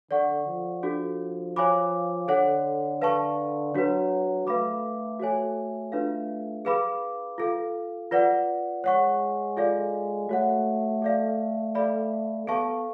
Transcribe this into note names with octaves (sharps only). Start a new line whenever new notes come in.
D3 A4 D5 F#5 C#6
F3
D4 F#4 A4
C#5 F5 G#5 B5 D6
D3 A4 C#5 F#5
B4 F5 A5 C#6
F#3 D4 F#4 B4
A3 B4 F5 B5 D6
F#4 A4 C#5 G#5
A3 D4 F4 B4 F5
G#4 B4 F5 B5 D6
F4 A4 F5
F4 B4 D5 F#5
G#3 C#5 F#5 C#6
F4 A4 D5 F5
A3 F#4 C#5 F#5
A4 D5 F5
A4 D5 F5 B5
B3 A4 F5 A5 C#6